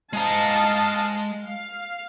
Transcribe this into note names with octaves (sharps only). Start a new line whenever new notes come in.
G#3 D#5 F5 A5 A#5
F5